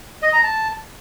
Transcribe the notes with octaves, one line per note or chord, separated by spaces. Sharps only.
D#5
A#5
A5